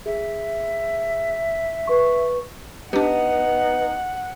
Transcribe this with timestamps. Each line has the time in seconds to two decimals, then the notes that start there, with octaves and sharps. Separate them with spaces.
0.06 G#4 E5
1.87 B4 C#6
2.93 B3 D4 D#4 G4 F#5